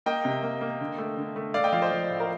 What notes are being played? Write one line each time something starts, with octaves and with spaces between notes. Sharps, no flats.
A#3 D#5 G5
C3
A#3
A#3
D3
A3
D3
A3
A3 D5 F5
D#5 G5
F3 D5 F5
C5 D#5
F3
A2
A#4